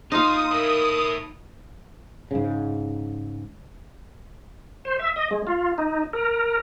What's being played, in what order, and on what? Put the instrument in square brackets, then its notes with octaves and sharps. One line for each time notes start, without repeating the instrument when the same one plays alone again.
[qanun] D#4 F5 [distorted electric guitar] F4 A#5 [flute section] C6 [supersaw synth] D#6
[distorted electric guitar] A2 E4 [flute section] A#4
[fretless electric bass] G#2 C#3
[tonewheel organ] C5
E5
D#5
G#3
F4
D#4
A#4